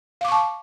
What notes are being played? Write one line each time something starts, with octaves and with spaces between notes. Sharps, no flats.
F5 A5 C#6 D6